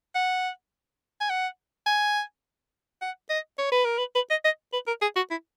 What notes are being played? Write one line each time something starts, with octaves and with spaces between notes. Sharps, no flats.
F#5
G#5
F#5
G#5
F#5
D#5
C#5
B4
A#4
B4
B4
D#5
D#5
B4
A#4
G#4
F#4
E4